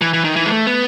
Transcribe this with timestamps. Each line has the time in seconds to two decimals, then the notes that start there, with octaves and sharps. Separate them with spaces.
0.01 E3
0.13 E3
0.24 D#3
0.36 E3
0.46 G#3
0.51 A3
0.67 B3